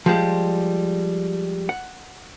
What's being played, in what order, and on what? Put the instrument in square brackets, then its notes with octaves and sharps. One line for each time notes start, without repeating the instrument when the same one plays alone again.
[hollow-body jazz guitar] F3 G3 G#3
F#5